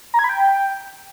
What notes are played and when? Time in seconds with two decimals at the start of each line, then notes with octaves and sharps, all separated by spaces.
0.14 A#5
0.19 G#6
0.24 B5
0.29 G5